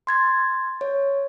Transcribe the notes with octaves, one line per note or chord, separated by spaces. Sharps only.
C6 G#6 A6
C#5